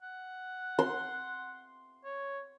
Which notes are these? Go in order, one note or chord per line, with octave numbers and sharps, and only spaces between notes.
F#5
C6
C#5